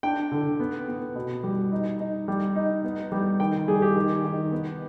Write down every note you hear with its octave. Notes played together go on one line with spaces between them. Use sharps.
D4 G5
D3
B3
B3
B2
G3
D#4
D#4
G3
D#4
B3
G3
D#3 G5
G3 G#4
G4
D#3
D#3
B3